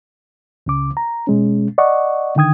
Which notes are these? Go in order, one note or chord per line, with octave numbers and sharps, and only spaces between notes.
C#2 C#3 D6
A#5
B2 G#3 C#4
D5 D#5 F#5 C#6
D3 D#3 G5 D#6 G#6